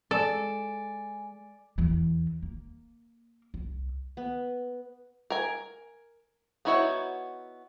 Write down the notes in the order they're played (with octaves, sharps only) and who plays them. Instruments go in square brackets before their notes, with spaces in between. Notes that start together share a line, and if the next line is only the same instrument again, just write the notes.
[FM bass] G#3 [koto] A4 [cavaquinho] D5 [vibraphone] G#5
[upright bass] E2 E3
A#3
C2
[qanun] B3
[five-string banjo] A#4 G#5
B3 D#4 E4 F#4 C#5